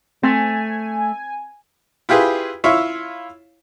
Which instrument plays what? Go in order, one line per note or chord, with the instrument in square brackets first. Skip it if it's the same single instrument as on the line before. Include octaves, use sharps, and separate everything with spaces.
[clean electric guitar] A3 [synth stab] C4 [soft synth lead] G#5
[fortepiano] E4 F4 G4 G#4 B4
E4 F4 C#5 E5 F5